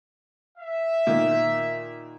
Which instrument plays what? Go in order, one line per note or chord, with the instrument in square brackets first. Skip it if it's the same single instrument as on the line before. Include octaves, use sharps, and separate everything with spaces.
[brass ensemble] E5
[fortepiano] A#2 D#3